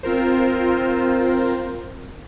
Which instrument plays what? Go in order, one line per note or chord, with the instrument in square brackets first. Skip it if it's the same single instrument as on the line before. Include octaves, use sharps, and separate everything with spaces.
[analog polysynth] C4 F4 A#4 C5